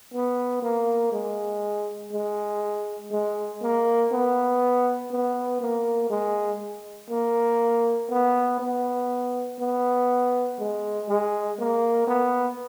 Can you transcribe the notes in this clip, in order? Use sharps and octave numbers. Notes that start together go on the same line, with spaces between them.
B3
A#3
G#3
G#3
G#3
A#3
B3
B3
A#3
G#3
A#3
B3
B3
B3
G#3
G#3
A#3
B3